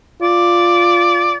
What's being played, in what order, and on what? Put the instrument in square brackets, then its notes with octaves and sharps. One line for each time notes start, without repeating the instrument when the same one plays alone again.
[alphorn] F4 [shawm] D5